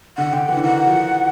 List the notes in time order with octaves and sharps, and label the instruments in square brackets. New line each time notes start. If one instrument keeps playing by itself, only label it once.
[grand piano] D3 [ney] F#5
[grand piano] D3 [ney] G5
[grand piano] E3 [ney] F#5
[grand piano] D3
[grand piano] D#3 [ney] F#5
[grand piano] F3